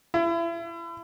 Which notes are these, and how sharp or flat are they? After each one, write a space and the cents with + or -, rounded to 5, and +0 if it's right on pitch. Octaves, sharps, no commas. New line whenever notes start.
E4 +35